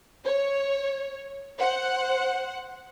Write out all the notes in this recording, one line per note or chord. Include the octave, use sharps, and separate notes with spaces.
C#5
C5 F#5